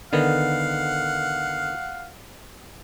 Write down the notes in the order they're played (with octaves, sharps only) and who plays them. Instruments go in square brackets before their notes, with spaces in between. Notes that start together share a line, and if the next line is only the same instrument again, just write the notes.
[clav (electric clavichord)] D3 D#3 B3 [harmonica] F5 F#5